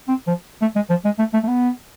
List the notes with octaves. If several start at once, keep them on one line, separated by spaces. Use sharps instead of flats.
C4
F3
A3
G#3
F3
G#3
A3
A3
A3
B3